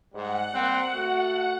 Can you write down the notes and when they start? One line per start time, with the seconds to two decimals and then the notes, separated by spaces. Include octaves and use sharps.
0.13 G#2 G3 F#5
0.54 G3 A#3 C4
0.93 A3 F#4